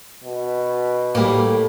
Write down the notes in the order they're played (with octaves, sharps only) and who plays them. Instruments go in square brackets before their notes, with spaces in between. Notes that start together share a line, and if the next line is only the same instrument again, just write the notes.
[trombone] B2
[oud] A2 [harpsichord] G3 A#3